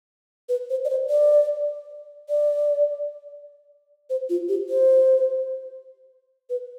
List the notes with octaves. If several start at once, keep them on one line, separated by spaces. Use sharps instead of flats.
B4
C5
D5
C5
D5
D5
C5
F4
G4
C5
B4